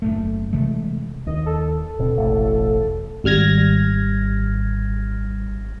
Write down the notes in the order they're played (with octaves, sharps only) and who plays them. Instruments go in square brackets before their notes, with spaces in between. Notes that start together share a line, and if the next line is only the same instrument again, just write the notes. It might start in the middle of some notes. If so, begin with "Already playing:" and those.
[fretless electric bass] F#1 D#2 A3
C3 E3 G#3 A3
[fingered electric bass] D#2 [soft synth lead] D#5
[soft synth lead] A4
[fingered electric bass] D1 B2 C4
E1 A1 A2
[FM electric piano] G#1 G3 F6 G#6 A#6